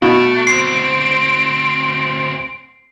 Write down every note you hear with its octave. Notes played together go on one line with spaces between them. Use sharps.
B2 A3 D7
D2 C4 C7